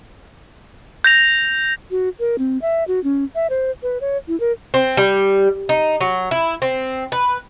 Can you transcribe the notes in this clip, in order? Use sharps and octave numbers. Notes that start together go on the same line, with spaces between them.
G6 A#6 F7
F#4
A#4
C4
E5
F#4
C#4
E5
C5
B4
C#5
E4
A#4
C4
G3
D#4
F#3
E4
C4
B4